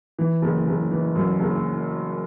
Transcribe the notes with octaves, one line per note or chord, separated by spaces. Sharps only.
E3
F#1
F#1
E3
F#2
F#1